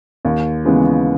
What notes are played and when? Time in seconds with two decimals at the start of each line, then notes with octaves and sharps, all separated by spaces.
0.25 D#2
0.65 C#3 E3 G#3 B3